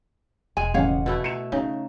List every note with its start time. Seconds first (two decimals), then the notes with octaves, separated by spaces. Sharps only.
0.57 E1 G#3 G#5
0.74 A1 C#3 C#5 F5 F#5 G#5
1.06 B2 A3 E4
1.24 C#7 E7
1.52 C#3 C4 D#4